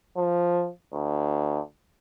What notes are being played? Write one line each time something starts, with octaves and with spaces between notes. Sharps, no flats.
F3
D2